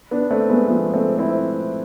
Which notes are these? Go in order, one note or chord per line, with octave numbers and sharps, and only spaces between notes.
B3 D4
A3 C4
G#3 B3
F3 A3
A3 C4
C4 E4